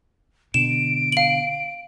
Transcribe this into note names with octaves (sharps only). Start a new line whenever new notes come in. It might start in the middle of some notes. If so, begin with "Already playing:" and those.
B2 D3 D7 E7
F5 F#7